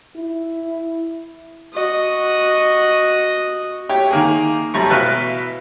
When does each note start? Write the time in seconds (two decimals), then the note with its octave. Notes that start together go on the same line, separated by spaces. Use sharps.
0.17 E4
1.73 F#4 D#5
3.89 E4 G4 C#5
4.11 D#3 A#3 G#4
4.74 F#2 F3 G3 A3 A#5 C#6
4.90 B2 E3 B4 E5 F5